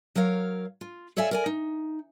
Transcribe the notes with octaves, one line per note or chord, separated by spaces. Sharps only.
F#3 A#4 C#5 F5
F4
A4 C#5 D5 E5 F5 G#5
A#4 D5 G#5
D#4